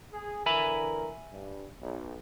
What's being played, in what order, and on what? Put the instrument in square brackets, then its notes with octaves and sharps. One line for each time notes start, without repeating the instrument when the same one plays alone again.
[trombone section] G#4
[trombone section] D3 E3 A#4 [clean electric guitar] E5 G#5 B5
[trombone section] G2
B1